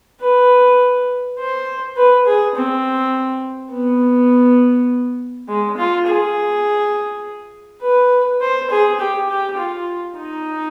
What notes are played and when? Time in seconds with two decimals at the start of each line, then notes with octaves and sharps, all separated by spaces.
0.21 B4
1.39 C5
1.97 B4
2.26 G#4
2.55 C4
3.72 B3
5.48 G#3
5.77 F4
6.07 G#4
7.82 B4
8.41 C5
8.70 G#4
9.00 G4
9.29 G4
9.58 F4
10.16 D#4